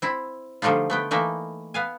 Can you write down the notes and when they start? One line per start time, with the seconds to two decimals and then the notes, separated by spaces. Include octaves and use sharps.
0.02 C4 E4
0.62 D3 F3 G3 A3 D#4 F4
0.90 A3 B3 G5
1.11 E3 A3 A#3 D#4
1.74 B3 F5 G#5